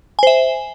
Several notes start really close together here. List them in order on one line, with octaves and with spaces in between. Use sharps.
G#5 C5 E5